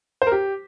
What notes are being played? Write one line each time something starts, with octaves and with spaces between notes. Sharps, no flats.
C5
A#4
G4